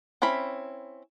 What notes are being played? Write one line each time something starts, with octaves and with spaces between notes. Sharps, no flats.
C4 C#4 E4 B5